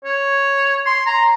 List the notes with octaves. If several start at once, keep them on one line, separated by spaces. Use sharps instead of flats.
C#5
C6
A#5